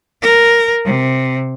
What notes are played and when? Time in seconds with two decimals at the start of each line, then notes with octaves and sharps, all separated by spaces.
0.22 A#4
0.85 C3